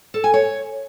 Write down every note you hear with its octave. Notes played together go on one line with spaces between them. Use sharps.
A4
G#5
C#5